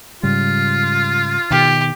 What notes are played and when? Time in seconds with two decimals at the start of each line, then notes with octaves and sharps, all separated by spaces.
0.23 G#2 C#3 G3 F4
1.51 B2 D#3 G4